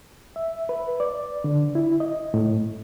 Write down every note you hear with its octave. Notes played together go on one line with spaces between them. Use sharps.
E5
B4
D5
D3
E4
D#5
A2